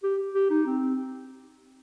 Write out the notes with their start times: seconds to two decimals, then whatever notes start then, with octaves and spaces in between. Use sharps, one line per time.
0.03 G4
0.35 G4
0.50 D#4
0.66 C4